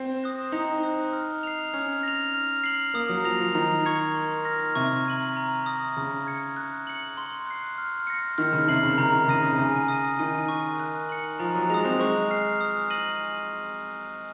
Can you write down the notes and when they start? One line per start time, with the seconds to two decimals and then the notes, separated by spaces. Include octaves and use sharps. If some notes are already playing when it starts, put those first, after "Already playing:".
Already playing: C4
0.23 D#6 F#6 A#6
0.52 D#4 A#5
0.83 D#6 F#6
1.13 F6
1.43 C7 F7
1.74 C#4 F6
2.03 A#6 F7
2.34 F6
2.64 C7 F#7
2.94 A#3 D#6
3.09 F#3
3.24 F3 A#6 F7
3.40 F3
3.54 D#3 A#5
3.86 C#6 G#6 C#7
4.15 C6
4.45 F6 A#6
4.75 C3 C#6
5.06 G#6 D#7 F#7
5.36 A#5
5.66 D#6 A#6
5.96 C#3 F6
6.27 G#6 C#7
6.57 F#6
6.87 C#7 F#7
7.17 C6
7.47 F#6 C7
7.78 F6
8.07 A#6 C#7
8.38 D#3 F6
8.53 C#3
8.68 C3 C7 F#7
8.83 C#3
8.98 C#3 A#5
9.13 D#3
9.28 C#3 D#6 A#6 D#7
9.43 C#3
9.52 C3
9.59 C#3 G#5
9.88 D#6 A#6 D#7
10.19 D#3 G#5
10.48 C#6 F#6
10.80 F#6
11.09 C#7 F#7
11.39 F3 A#5
11.55 F#3
11.70 G#3 D#6 A#6 F7
11.85 C4
11.99 G#3 C#6
12.30 F6 C7
12.61 D#6
12.90 A#6 D#7 F#7